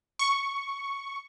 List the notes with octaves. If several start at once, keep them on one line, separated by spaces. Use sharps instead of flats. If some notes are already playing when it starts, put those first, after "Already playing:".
C#6